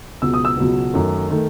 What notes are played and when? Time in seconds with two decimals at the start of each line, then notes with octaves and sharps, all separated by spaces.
0.22 C#2 B2 F#3 B3 E6
0.34 D#6
0.45 E6
0.57 C#2 B2 F#3 B3
0.94 F#2 D#3 A3
1.30 D#3 A3